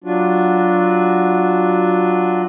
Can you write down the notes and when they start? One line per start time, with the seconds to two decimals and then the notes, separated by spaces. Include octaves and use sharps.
0.04 F#3 D4 F4 F#4